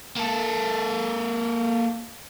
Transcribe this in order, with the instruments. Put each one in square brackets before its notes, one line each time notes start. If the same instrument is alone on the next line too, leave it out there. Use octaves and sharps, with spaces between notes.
[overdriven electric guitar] A#3 A4